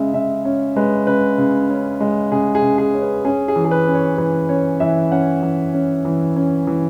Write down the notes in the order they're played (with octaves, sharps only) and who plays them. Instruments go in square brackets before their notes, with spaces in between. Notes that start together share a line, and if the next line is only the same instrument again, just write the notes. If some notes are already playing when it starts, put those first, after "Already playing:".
Already playing: [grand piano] C#3 G#3 E5
C#3 E5
C#4
G#3 B4
C#3 B4
C#3
C#4
G#3
C#3 G#4
G#4
C#3
G#4
C#4
B4
C#4 G#4
G#4
E3
G#4
B4
C#4
C#5
E3 B4
C#4 C#5
E3 E5
C#4 F#5
E3
C#4
E3
C#4
E3